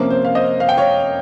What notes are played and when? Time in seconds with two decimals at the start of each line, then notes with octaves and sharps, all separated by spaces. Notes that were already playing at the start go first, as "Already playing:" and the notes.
Already playing: C3 F3 A#3 C#4
0.10 C5
0.25 F5
0.35 C5 D#5
0.60 F5
0.69 G5
0.77 C#5 F5